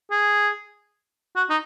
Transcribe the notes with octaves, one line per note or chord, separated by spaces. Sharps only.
G#4
F#4
D#4